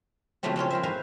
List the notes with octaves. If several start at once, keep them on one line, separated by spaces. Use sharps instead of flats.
C#3 F3 F#3 A3 B3 C4
C4 C#4 F4 C#5
C4 A#4 C5 E5
B4 C5 F5 G#5 A#5